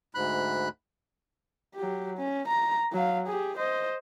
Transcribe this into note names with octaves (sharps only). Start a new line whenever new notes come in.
D2 G#2 B5 F#6
F#3 G4
C#4
A#5
F#3 F5
G4 G#4
C5 D#5